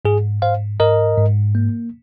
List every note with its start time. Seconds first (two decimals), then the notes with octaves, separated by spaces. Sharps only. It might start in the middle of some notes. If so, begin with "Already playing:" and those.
0.05 G#2 G#4
0.42 G#2 C5 F5
0.80 G#2 A#4 D#5
1.18 G#2
1.55 A#3